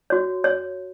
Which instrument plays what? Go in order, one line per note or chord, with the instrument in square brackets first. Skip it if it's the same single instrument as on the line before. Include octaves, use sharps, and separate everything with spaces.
[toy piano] F#4 C#5
C#5